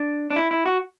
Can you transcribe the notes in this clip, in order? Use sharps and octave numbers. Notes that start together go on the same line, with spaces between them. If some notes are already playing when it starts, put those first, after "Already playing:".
Already playing: D4
D4
E4
E4
F#4